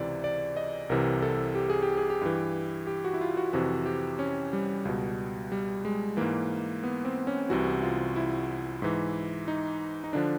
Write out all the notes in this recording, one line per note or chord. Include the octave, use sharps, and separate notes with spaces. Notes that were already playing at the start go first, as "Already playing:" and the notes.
Already playing: C#2 C3 E3 D5
D5
D#5
C2 C3 E3 A#4
A4
G4
G#4
G4
G#4
G4
G2 E3
G4
F#4
E4
F4
F#4
F2 C3 E3 F#4
G4
C#4
G3
C#2 B2
G3
G#3
G#2 E3 A#3
B3
C4
C#4
C2 C3 E3 F#4
F4
E4
G#2 E3
D#4
D#4
D3 F3 D4